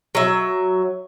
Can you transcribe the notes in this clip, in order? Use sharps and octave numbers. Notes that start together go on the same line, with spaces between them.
F#3 E5